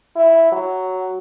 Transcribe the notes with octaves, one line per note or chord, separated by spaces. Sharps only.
E4
F#3